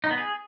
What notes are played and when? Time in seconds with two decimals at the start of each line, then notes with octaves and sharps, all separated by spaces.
0.04 D#4
0.11 B3
0.18 G#4